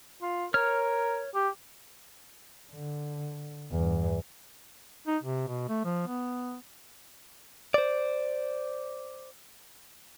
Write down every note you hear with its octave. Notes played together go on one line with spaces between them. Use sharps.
F4
A#4 C#5 F6
G4
D3
E2 G2
D#4
C3
B2
A3
F3
B3
C5 D5